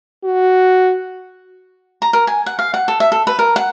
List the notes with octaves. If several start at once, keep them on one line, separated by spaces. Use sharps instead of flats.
F#4
A#5
A#4
G#5
F#5
F5
F#5
A4
E5
A4
B4
A#4
F#5